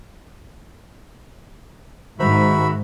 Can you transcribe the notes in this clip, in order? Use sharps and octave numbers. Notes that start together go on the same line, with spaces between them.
G#2 D#3 F#4 C5 E5 A#5 B5